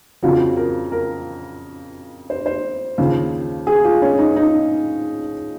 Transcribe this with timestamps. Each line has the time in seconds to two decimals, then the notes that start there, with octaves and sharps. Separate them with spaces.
0.23 F2 C#3 F3 F#4
0.57 A#4
0.92 A#4
2.30 C5
2.46 C5
2.98 D#2 C#3 F3
3.67 G#4
3.85 F4
4.02 C#4
4.18 D#4
4.36 D#4